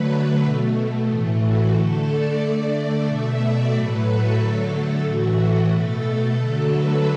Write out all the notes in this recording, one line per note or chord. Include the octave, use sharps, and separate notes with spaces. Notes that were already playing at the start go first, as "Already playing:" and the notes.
Already playing: D3 F#3 A3 B4
B2 A3
A2 E3 A3
F#4
D3 A3 A4
D5
D3 A3
D5
B2 A3 E5
D5
A2 F#3 A3 B4
A4
D3 F#3 A3
A4
A2 E3 A3 F#4
B2 A3 A4
D3 F#3 A3
B4